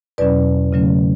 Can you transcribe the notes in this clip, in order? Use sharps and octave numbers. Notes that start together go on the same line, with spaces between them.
E2 B2 F#3 C#4 B4 D5
C#3 F#3 A3 C#4